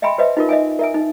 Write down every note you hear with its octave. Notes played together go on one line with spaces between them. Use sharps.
D#5 E5 G5 G#5 B5 C6
B4 C5 D#5 E5
D#4 F4 A#4
D#5 E5 G#5
A#4 E5 G#5
D#4